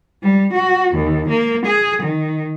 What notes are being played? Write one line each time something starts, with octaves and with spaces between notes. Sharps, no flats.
G3
F#4
D#2
A#3
G#4
D#3